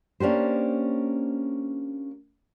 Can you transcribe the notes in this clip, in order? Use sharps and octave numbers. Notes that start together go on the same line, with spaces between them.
A#3 C#4 D4 G4 C5